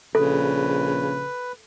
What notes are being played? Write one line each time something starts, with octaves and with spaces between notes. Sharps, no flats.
A#1 C#3 A4 B4